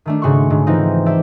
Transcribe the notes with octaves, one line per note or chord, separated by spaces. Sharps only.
D#3 A3 D4
G#2 C#3 F#4 C6 C#6
G#2 D3
E3 F3 C4 D#4
A4 C5 D5 E5